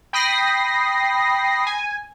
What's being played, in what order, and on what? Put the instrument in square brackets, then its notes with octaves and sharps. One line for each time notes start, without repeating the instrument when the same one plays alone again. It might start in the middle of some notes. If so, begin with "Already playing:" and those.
[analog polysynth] G5 B5 D#6 A#6 C7
G#5